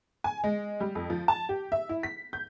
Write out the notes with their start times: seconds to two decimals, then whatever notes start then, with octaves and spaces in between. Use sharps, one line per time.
0.24 G#5
0.44 G#3
0.80 G3
0.95 F2
1.10 F3
1.28 A5
1.49 G4
1.72 E5
1.89 E4
2.03 B6
2.33 G6